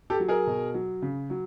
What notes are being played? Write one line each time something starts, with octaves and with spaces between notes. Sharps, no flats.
G4 A4
F#3
G#4 A#4
B2
F#3
C#3
F#3